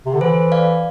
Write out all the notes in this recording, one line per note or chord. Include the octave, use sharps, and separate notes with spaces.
C3
D3
E3 A4 C5
D5 F5